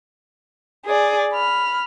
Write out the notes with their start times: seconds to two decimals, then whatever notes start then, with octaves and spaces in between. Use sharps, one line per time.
0.85 G#4 D5
1.33 B5 F6